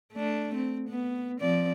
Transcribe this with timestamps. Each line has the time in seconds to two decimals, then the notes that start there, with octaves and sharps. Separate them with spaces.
0.13 A3 D4
0.55 C4
0.89 B3
1.40 F3 C4 D5